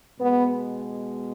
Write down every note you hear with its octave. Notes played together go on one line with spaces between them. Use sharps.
B2 G#3 B3